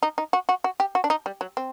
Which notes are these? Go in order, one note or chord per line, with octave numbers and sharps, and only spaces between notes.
D#4
D#4
F#4
F#4
F#4
G4
F#4
D4
D#4
G3
F#3
C4